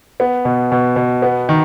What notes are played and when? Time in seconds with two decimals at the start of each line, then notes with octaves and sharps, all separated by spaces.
0.20 B3
0.45 B2
0.72 B2
0.96 B2
1.22 B3
1.49 D#3